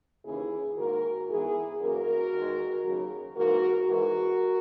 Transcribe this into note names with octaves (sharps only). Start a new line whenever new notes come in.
D#2 C#3 E3 A#3 E4 G#4
G#2 D#3 A#3 F#4 A#4
G#2 E3 B3 E4 G#4
F#2 E3 A#3 F#4 A#4
E2 D#3 G#3
D#2 C#3 F#3
G#2 E3 A#3 F#4 A#4
G#2 E3 G#3 F#4 A#4